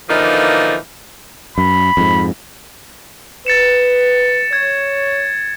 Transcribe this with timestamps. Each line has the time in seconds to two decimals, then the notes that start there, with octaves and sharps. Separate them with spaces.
0.10 D3 E3 F3 A#3 D#4
1.58 F#2 B5
1.97 F2 G#2
3.46 B4 A6 C#7 E7
4.53 C#5 G#6